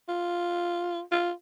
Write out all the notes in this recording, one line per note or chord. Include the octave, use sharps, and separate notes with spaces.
F4
F4